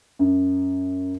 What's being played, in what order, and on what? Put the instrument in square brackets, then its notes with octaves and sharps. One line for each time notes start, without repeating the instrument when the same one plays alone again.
[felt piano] F#2